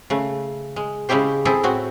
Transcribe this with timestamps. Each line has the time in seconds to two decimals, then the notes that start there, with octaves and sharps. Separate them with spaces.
0.10 C#3 A3
0.76 G#3
1.09 C#3 G#3 C#4 E4 G4 C5
1.45 C4 E4 G#4 A4
1.63 A2 C4 F#4